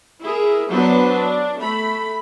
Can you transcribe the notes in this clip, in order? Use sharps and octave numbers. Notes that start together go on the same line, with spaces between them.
E4 G#4 A#4
F#3 B3 D4 B4 C5
D4
A3 B5